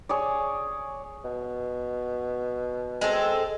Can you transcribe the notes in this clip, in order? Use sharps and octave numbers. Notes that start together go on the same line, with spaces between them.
G#4 C#5 D5
B2
G#3 C4 A4